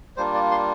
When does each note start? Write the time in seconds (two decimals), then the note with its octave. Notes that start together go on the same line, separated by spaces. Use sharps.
0.17 G3 A#3 D4 F4 C5
0.34 D5
0.51 C6